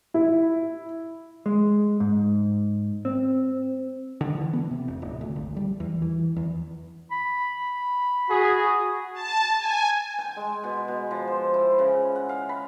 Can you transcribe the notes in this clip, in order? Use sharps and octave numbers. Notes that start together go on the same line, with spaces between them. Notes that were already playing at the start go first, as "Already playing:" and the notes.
E4
G#3
G#2
C4
D3
E3
B3
C3
F1
D1
D2
G#1
G3
E2
E3
E2
B5
F#4 G#4
A5
G#5
G5
G#3
B2
B2
F3
C5
E4
C#3
F#5
F5
B5